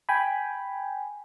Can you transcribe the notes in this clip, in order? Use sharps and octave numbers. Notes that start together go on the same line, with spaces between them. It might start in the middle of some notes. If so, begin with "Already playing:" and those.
G5 G#5 B5